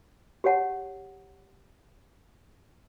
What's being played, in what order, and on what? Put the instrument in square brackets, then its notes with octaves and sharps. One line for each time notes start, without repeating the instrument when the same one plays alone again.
[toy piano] G4 G#4 C#5 F#5 A5